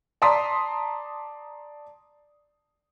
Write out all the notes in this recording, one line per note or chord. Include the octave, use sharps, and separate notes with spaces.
D5 A5 A#5 C6 D#6 B6